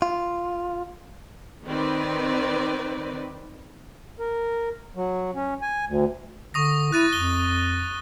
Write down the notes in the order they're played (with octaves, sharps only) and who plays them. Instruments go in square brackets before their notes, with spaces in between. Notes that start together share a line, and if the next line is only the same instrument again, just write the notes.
[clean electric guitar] F4
[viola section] D#3 C4 B4 D5
[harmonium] A#4
F#3
C#4
G#5
D2
[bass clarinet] D3 [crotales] C#6 D#6 A#6
[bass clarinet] E4 [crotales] F#6 A6 D#7
[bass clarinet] F2 [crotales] G7